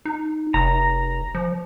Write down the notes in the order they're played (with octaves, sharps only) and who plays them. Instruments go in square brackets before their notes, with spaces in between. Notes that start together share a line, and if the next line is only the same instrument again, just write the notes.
[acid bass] D#4
[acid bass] F1 [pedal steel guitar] A#5
[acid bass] F3